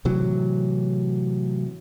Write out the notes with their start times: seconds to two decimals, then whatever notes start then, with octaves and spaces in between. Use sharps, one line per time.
0.05 A2 C3 E3 F#3